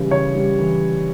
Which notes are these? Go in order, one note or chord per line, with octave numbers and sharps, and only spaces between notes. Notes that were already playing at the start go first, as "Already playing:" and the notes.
Already playing: C#3 E3 G3
C#3 C#5
G3
E3